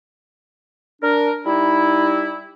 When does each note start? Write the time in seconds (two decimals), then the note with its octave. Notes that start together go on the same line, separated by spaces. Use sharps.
1.02 D4 A#4
1.46 G3 D#4 E4